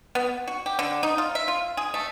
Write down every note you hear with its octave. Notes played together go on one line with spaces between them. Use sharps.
B3
F#4
G4
D3
D#4
F4
E5
F4
G#4
A3